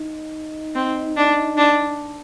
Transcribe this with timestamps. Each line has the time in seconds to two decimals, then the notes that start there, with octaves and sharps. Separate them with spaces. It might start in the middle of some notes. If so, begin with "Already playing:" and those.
Already playing: D#4
0.75 C4
1.17 D4
1.57 D4